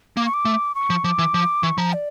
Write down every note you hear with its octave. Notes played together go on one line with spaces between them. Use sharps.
A#3 D6
C#6
D6
A3
C#6
F3
F3 D6
E3
F3
E3 C#6
F3 A#5
D5